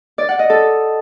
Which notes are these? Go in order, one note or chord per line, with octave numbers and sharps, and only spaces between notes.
D5
F#5
D#5
A4